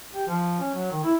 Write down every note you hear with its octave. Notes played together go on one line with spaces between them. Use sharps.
G4
F3
C#4
F#3
D#3
E4